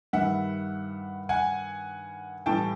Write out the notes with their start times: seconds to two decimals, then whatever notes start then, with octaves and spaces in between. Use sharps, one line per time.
0.13 G2 D#3 G3 E5 F#5
1.29 F#5 G#5
2.46 A2 E3 G3 G5 A5